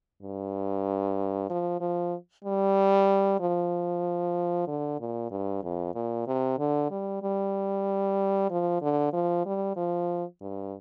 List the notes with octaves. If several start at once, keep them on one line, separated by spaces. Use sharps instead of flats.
G2
F3
F3
G3
F3
D3
A#2
G2
F2
A#2
C3
D3
G3
G3
F3
D3
F3
G3
F3
G2